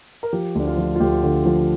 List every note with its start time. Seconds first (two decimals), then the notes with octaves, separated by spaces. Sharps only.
0.23 A#4
0.33 F3 G4
0.55 D2 D4
0.67 F4
0.77 F3
0.96 F4
1.00 D2 G4
1.23 D3
1.46 F3